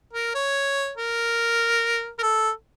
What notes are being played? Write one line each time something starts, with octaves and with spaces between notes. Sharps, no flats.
A#4
C#5
A#4
A#4
A4